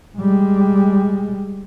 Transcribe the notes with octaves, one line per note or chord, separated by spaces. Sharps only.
G3 G#3